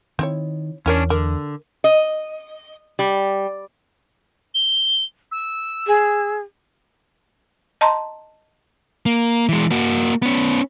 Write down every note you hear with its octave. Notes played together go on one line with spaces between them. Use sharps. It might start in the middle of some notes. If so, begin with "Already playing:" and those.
D#3 C4 E4 C#5
E2 C#4 D4 E4 A#4 C#5
D3 A#4
D#5
G3
G7
E6
G#4
D#5 A5 A#5 C6
A#3
E3 G#3
A#3 F#4
B3 C#4